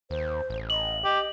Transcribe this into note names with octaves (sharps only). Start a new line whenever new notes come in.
D#2 C5
A1
D#5 F#7
G4 D#5